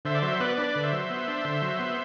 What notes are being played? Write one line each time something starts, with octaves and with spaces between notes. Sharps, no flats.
D3 C5 E5
D5
F#3 C5 E5
B3 B4 D5
D4 B4 D5
D3
C5 E5
F#3
B3
D4
D3
F#3
B3